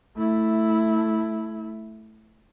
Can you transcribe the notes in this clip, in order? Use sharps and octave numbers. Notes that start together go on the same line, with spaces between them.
A3 E4